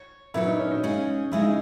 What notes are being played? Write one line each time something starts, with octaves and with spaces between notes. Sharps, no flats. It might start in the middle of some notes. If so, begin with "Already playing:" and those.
Already playing: C#5
A#2 F#3 B3 E4 F#4 C#5
D#4
C#4
D#4
C#3 G#3 C#4 G#4
C#3 G#3 C#4 E4 G#4
D#4